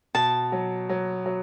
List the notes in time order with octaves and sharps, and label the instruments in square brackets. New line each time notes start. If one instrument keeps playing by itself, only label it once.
[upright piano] B2 [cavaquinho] A5
[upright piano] F#3
F#3
F#3